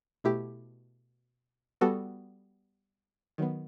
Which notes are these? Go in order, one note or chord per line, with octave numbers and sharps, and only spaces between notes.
B2 A3 E4 G4
G3 B3 F#4 A4
D#3 F#3 B3